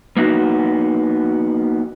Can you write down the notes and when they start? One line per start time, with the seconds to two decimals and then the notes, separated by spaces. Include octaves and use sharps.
0.17 A#3 B3 D#4 F#4